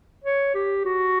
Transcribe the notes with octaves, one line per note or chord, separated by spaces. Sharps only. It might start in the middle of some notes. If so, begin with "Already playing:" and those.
C#5
G4
F#4